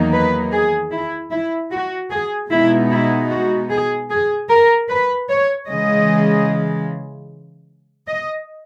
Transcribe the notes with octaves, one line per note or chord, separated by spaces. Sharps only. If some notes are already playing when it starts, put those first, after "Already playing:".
Already playing: E2 D#3 F#3 A#3 D#4
B4
G#4
E4
E4
F#4
G#4
B2 G#3 B3 D#4 E4
E4
F#4
G#4
G#4
A#4
B4
C#5
C#3 E3 G#3 D#5
D#5